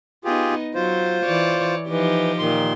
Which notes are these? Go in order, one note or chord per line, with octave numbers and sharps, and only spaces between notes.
B3 D#4 F4 G4 G#4
F#3 F4 C5
E3 C#5 D5
E3 F3 D#4 G4
A#2 D#3 C6